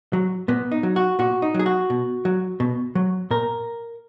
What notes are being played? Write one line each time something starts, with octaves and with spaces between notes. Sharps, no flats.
F#3
A#2 B3
D#4
F#3
F#4
A#2 F#4
D#4
F#3 G#4
F#4
B2
F#3
B2
F#3
A#2 A#4